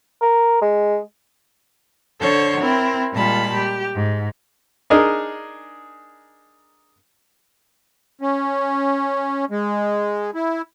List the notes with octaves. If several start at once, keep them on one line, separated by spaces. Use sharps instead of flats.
A#4
G#3
D3 A4 C5 C#5
C4 E4 A#4
A#2 G3 G#3 F4 A5 B5
G4
G#2
D4 D#4 G#4 A#4 D#5
C#4
G#3
E4